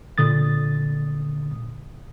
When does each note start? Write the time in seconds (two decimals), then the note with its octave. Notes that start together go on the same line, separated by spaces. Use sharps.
0.18 A#2 D3 D#6 A6